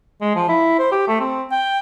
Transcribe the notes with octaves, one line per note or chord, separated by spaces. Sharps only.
G#3
F3
E4
C5
G4
A3
C4
G5